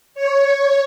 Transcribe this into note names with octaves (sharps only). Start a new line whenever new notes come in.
C#5